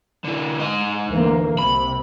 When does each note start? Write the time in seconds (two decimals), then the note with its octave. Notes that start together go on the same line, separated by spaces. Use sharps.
0.24 D3 E3
0.59 G#2 D#5
1.07 D2 E3 A#3
1.59 C2 C3 B5